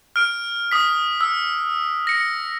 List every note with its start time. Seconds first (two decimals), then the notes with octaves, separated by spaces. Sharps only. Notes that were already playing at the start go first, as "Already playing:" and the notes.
0.16 F6 D7
0.72 D#6 B6
1.21 E6
2.07 A#6 C#7